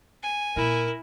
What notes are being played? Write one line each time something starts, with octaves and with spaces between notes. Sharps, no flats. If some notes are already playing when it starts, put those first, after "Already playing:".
G#5
A#2 E4 A#4